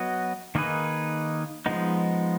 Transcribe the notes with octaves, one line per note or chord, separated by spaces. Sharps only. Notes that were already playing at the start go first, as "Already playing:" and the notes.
Already playing: F#3 B3 F#4 B4 D#5
D#3 A#3 D#4 G#4 B4
F3 G#3 B3 D#4